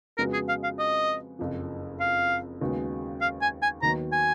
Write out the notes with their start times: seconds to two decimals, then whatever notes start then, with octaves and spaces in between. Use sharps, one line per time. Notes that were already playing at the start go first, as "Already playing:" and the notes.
0.18 F2 C#3 G#3 B3 F#4 A#4
0.33 G#4
0.49 F5
0.63 F5
0.79 D#5
1.39 F#1 F2 F3
2.00 F5
2.61 D#2 C#3 G#3 B3 F#4
3.21 F5
3.42 G#5
3.62 G#5
3.82 D#2 D#3 F#3 B3 A#5
4.12 G#5